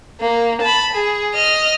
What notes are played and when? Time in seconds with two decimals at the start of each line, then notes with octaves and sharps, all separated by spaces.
0.21 A#3
0.62 A5 B5
0.93 G#4
1.34 D#5 F6